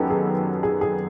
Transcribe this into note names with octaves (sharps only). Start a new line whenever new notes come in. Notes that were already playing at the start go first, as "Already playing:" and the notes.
Already playing: F#2 D#3 F#3 B3 G4 A4
G#4
G#4
G#4